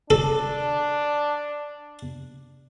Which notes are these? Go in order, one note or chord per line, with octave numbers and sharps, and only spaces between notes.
D4 A4